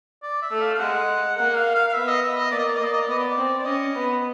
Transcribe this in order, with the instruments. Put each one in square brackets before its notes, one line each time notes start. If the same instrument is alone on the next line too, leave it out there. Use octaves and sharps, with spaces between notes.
[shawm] D5
E5
[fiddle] A3
[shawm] F5
F5
[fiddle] G#3 [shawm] F#5
[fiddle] A#3 [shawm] F#5
[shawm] F5
F5
F5
[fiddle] B3 [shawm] E5
[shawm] D#5
E5
D#5
[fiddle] A#3 [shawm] D5
[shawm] D#5
D5
[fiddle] A#3 [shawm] D#5
[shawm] D5
D#5
D5
[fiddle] B3 [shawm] D#5
[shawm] D5
[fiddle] C4
[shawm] D5
[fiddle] C#4 [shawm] D#5
[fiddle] B3